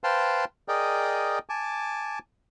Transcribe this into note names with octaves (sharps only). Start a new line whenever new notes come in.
B4 C5 F5 G5 A5 C6
G#4 A#4 D5 D#5 G5
G#5 A5 D6